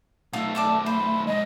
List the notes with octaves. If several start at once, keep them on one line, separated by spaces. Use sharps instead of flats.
B1 A3 F4
D5 E5 A5
C5 B5
A#2 G#3 D#5